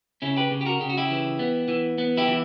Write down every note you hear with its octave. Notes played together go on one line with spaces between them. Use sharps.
C#3 C#4 E4
G4 B4
C#3
G4
F#4 A#4
C#3 G4
F#4
E4 G4
E3
B3
E3
B3
E4 G4
E3